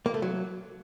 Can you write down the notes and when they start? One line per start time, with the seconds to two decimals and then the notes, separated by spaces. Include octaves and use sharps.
0.06 A#3
0.14 A3
0.22 F#3